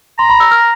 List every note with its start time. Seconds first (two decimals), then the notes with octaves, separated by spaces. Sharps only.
0.19 A#5 C6
0.30 B5
0.40 E6
0.51 F6